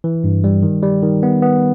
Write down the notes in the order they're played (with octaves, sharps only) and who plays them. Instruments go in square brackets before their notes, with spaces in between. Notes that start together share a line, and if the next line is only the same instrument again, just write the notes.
[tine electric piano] E3
G2
G3
D#3
G3
D#3
B3
B3